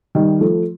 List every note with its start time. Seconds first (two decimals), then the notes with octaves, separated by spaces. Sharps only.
0.15 D#3 G3
0.41 F3 A3